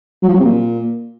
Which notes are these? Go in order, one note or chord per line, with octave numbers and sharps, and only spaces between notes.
F#3
F3
F#3
C3
A#2